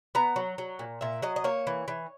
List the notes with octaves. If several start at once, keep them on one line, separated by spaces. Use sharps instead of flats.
B3 A#5
F#3
F#3
A#2
A#2 E5
F#3 D#5
D#5
A#3 C#5
E3
E3